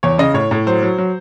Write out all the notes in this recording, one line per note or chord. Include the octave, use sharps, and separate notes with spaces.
E2 C#5
C#3 D#5
A2 C#5
A2
F#3 C5
F#3
F#3